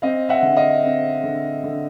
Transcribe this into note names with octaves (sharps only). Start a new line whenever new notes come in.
C4 D#5 F5
E5 F#5
D3
D#5 F5
C4
D3
D3